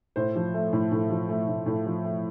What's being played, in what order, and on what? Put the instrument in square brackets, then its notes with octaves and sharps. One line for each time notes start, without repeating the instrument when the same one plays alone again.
[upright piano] A2 C5
F3
A3
A2
A2
F3
A3
A2
A2
F3
A3